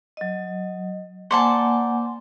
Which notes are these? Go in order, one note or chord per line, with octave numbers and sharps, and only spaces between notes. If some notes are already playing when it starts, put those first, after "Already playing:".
F#3 D#5
A#3 C5 D5 F#5 G#5 A5